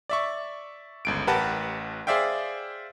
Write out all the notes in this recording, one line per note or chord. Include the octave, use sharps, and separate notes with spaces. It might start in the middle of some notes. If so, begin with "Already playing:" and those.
D5 E5 C#6
G1 C#2 D7
A1 G4 A#4 B4 F#5 A5
G#4 C5 D5 E5 F5 G5